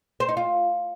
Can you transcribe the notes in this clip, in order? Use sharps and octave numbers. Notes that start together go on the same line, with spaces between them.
C5
D#4
F4